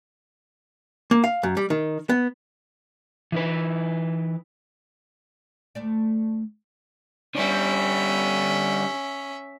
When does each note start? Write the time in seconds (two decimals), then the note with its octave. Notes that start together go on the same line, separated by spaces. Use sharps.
1.11 A#3
1.24 F5
1.43 F#2
1.57 G3
1.70 D#3
2.09 B3
3.32 E3 D#4 B4
5.75 D2 A3 D5
7.35 D3 G3 C#4 E5